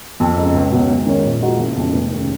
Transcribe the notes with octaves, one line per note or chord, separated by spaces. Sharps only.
F2
C#3 G#3 D#4
C#2
B2 F#3 B3 F#4
G#1
G#2 D#3 A#3 C#4
A#2
F3 G#3 D#4 F#4
F#1
F2 C#3 G#3
F1
D#2 C#3